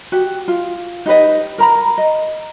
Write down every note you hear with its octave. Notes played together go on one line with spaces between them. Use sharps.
F#4 G4
F4
D#4 G4 B4 D#5
A#4 A#5 B5
D#5